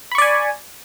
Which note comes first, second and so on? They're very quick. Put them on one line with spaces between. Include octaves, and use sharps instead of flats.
B5 C#6 D5 G#5